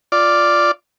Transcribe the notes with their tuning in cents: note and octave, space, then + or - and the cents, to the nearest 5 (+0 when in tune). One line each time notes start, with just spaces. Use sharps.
F4 +0 D5 +0